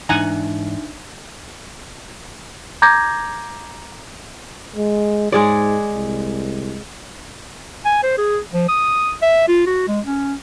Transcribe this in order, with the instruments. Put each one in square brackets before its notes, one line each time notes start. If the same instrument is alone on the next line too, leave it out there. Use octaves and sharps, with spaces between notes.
[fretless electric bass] G#2 E3 [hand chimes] D4 D#4 E5 [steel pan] F#5 G#5 A#5
[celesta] A#5 D6 G6 G#6 A#6
[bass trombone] G#3
[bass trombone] G#2 [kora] G#3 G#4 D5
[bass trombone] C2
[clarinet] G#5
C5
G#4
F3
D#6
E5
F4
F#4
G#3
C#4